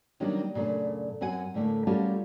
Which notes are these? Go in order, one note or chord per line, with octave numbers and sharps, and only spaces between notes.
D#3 F#3 G3 A#3 C#4 D4
F#2 A#2 C#3 A3 D4
F#2 C4 F#4 F#5 G#5
A2 D3 A3 A#3
G3 A3 A#3 C#4 F4 F#4